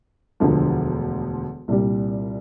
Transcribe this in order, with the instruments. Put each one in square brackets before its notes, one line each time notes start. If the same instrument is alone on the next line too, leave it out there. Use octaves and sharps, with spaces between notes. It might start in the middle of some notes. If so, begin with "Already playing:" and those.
[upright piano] E1 D2 D3 F3
C2 A#2 G3